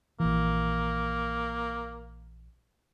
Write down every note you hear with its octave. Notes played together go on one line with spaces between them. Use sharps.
A#1 E3 A#3